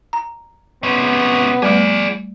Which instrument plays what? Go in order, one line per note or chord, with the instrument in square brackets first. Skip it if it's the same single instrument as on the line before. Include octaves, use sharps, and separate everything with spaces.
[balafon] A#5
[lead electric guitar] C3 C#4 [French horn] B3
[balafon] G3 A3 [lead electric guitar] G#4 D5